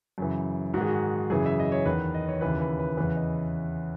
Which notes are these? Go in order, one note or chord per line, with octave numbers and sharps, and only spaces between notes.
F#2 C#3 E3
G#2 D#3 F#4 G#4
F#4
F#2 C#3 E3 G#4
E5
D#5
C#5
E2 D#3 B4
D#5
C#5
D#2 C#3 E3 B4
B4
B4
E2 C#3 E3 B4
D#5